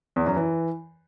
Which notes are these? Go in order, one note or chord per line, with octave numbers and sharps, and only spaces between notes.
E2
F#2
E3